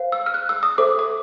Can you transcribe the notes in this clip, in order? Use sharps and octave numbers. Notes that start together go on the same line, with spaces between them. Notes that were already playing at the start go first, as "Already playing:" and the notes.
Already playing: C5 F5
E6
F6
F#6
E6
D#6
A4 C5 E5 D6
D6